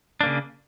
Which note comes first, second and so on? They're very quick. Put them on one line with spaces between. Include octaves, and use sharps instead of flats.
D4 A#3 C#3